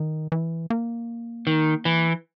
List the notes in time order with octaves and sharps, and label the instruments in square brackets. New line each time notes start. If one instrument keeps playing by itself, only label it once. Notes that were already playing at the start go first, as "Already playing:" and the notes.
Already playing: [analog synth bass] D#3
E3
A#3
[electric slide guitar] D#3
E3